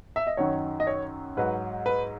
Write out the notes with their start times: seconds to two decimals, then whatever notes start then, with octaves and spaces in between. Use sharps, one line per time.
0.16 E5
0.27 D#5
0.37 F#2 D#3 F#3 C#5
0.80 D#5
0.87 C#5
1.37 G#2 F#3 B4
1.86 B4